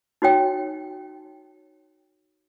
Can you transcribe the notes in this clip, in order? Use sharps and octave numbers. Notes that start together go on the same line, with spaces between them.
D#4 F#4 C#5 G5